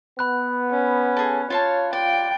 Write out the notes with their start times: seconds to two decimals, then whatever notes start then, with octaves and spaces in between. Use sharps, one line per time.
0.19 B3 B5 F#6
0.70 C#4
1.17 G#4 A4
1.50 F4 C#5 F5 A5
1.93 F4 D5 G5 A6